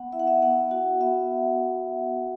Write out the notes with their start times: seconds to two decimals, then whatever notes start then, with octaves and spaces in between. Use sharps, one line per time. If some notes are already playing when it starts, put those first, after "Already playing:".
Already playing: B3 F#5
0.13 E4 E5
0.20 F#5
0.27 E5
0.42 B3 F#5
0.71 F#4 F#5
1.00 B3 E5